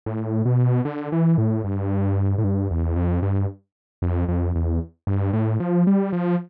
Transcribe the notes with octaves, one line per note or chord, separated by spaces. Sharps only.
A2
B2
D3
E3
A2
G2
A2
G2
E2
F2
G2
F2
F2
E2
G2
A2
F3
G3
F3